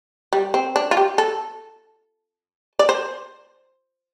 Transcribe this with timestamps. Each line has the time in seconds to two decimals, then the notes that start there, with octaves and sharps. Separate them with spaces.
0.33 G3
0.54 C4
0.76 D4
0.91 F4
0.97 G4
1.18 A4
2.79 D5
2.89 C5